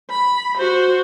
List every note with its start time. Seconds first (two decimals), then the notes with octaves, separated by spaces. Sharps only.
0.10 B5
0.57 F#4 C5